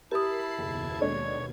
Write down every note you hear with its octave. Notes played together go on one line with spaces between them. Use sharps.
E4 G4 A#4 A5 B5 D#6 C7
F#1 D#2 B2 G#6
G#3 D4 A4 C#5